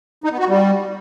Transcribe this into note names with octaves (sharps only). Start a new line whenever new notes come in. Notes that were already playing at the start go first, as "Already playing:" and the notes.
D#4
B3
F#4
G3